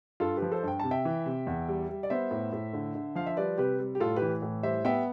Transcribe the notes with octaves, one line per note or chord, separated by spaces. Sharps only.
G2 F4 A4
G4 B4
F3
A4 C5
G2 G5
C3 A5
E5 G5
E3
C3
E2
G3
G3
D5
B3 C5 E5
A2
A2
D3
D3
F3 F5
E5
G3 B4 D5
C3 G4 B4
G3
G4
A2 F4 A4
G4 B4
E3
A2
G3 C5 E5
B3 E5 G5